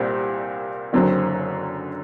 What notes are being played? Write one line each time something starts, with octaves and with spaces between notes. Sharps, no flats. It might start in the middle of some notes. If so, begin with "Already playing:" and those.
Already playing: C2 A#2 G3 C4
F#1 F#2 D3 F#3 C4